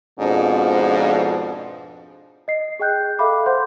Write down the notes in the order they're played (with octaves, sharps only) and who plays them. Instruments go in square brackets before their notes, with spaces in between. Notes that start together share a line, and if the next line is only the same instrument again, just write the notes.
[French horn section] F2 G#2 B2 F3 D4
[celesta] D#5 C7
G#4 D#5 G5 F#6 G6
A4 E5 F5 G5 B5 D6
C5 F#5 C6 G6